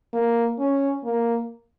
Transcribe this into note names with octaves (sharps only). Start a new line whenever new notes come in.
A#3
C#4
A#3